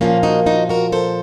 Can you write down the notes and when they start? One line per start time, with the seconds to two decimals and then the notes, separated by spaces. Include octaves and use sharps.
0.01 A#2 F3 A#3 C#4 F4
0.23 D#4 F#4
0.47 D#4 F#4
0.69 F#4 A#4
0.92 A4 C5